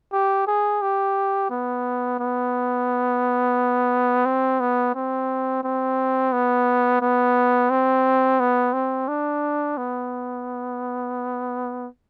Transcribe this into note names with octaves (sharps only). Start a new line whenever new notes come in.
G4
G#4
G4
B3
B3
C4
B3
C4
C4
B3
B3
C4
B3
C4
D4
B3